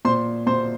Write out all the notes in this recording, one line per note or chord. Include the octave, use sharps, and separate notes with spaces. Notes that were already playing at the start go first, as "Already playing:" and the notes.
A#2 C5 C6
A#2 C5 C6